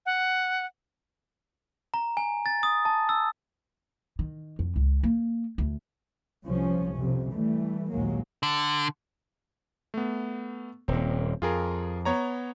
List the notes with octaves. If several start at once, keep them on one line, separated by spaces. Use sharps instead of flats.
F#5
A#5
G#5
A6
D#6
A5
E6
D#3
F2
C#2
A#3
D2
C2 F3 C#4
F2 C3
E3 G3 A3
A#1 D#2 F#3 G#3 A#3
D3
A3 B3
D#1 A#2 C4
F2 F4 G#4 A#4
B3 C#5 A#5